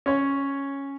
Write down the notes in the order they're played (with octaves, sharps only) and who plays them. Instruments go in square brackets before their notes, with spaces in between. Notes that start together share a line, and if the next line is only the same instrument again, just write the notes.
[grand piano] C#4 C#5